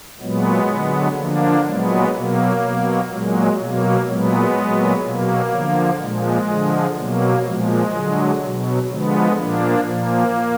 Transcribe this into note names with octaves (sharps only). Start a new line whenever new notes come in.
A#2 F#3 G#3 B3
D3 F#3
D3 F3 A#3 D4
A#2 F#3 G#3 B3
B2 F#3 A#3
B2 F#3
A#2 F#3 G#3
B2 F#3 A#3
A#2 F#3 G#3 B3
A#2 F#3
B2 F#3 A#3
D3 F3
A#2 F3 G#3
D3 F3
B2 F#3 A#3
A#2 F3 G#3
D3 F#3
B2 F#3
D3 F3 G#3 B3
A#2 F3 A#3 D4
A#2 F3 A#3